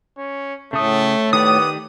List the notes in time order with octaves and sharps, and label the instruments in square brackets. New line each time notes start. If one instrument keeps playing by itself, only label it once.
[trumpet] C#4
[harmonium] A2 [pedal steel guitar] C#3 D#6 [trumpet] A3
[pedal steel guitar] D#3 G4 D5 [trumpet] B3 [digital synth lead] D#6